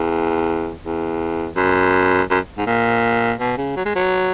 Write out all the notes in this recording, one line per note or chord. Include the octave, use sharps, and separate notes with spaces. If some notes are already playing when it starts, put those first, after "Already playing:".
Already playing: E2
E2
F#2
F#2
G#2
A#2
B2
C#3
F#3
G#3
F#3